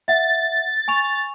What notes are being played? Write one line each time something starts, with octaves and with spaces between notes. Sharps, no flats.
E5 F#5 A6
G#5 C#6 F7